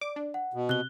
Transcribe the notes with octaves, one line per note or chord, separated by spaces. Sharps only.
D5 D6
D4
F#5
B2
C3 F#6 G7